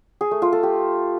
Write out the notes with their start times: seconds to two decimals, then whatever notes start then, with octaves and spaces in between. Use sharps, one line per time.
0.21 G#4
0.31 A3
0.42 F4
0.53 A4
0.63 G4